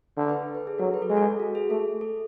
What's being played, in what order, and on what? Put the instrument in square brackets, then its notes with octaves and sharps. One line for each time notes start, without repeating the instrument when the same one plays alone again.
[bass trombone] D3
[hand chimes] B4
A4
B4
G#4
[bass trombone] F#3 [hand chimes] A4
[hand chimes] B4
A4
[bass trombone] G#3 [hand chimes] G#4
[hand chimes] A4
F#4
G#4
[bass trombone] A3 [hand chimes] A4
[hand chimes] A4